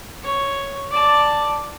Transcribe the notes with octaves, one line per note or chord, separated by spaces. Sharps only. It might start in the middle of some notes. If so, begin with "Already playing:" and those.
C#5
D5 A5